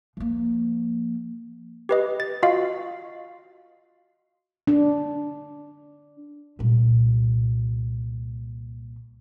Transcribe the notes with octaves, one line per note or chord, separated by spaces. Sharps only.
F3 A#3
G4 B4 D#5
A6
F4 F#4 D#5 F5
D4
C2 A#2